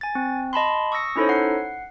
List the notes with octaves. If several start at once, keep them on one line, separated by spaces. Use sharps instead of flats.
G#5 A6
C4
D#5 A5 B5 C6
C#6 D#6 E6 A#6 C#7
C#4 D#4 E4 A4 C5 C#5
F#5 C7